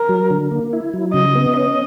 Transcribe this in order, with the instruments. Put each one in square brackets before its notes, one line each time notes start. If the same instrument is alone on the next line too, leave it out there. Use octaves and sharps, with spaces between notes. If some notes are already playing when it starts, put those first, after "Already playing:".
Already playing: [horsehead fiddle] A#4
[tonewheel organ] F#3
D3
A#3
E4
F#3
[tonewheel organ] C#3 [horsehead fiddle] D#5
[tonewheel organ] B3
[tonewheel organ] C#4 [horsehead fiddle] D#5